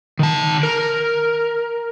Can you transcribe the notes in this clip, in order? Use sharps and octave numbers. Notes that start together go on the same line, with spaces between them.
D#3 A5
A#4